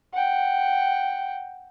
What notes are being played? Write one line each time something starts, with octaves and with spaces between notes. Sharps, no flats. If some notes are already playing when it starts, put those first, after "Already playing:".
F#5 G5